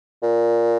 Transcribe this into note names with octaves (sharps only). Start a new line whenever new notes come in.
A#2